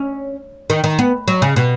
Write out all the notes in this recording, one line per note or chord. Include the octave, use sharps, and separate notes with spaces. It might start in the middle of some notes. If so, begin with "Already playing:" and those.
Already playing: C#4
D#3
D#3
B3
F#3
C#3
B2